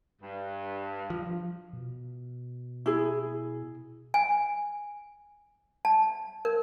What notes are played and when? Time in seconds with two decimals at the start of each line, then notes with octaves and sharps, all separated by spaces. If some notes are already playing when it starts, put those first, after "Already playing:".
0.22 G2
1.10 F3
1.73 B2
2.86 E4 G#4
4.14 G#5
5.85 A5
6.45 A#4